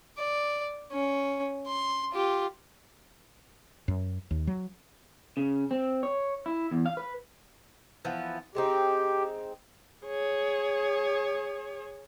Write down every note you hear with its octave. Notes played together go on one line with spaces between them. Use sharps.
D5
C#4
C6
F4 G4
F#2
D#2
F#3
C#3
C4
C#5
E4
E2
F5
B4
E3 F3 B3
G#3 C4 D#4 G4
G#4 C#5